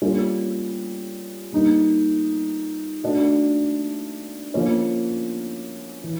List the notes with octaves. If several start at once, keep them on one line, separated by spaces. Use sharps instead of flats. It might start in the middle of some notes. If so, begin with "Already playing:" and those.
G3 A#3 C#4 F4 A4
G3 A#3 D#4
A3 D4 F#4
F3 A#3 C#4
E3